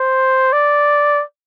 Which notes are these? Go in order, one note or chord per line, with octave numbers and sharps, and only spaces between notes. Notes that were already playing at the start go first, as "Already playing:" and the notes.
Already playing: C5
D5